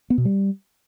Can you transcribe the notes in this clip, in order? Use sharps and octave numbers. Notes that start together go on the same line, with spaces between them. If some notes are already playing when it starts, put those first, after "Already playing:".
B3
B2
G3